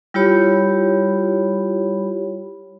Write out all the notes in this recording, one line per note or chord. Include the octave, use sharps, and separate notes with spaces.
G3 E4 F4 G4 C#5 B5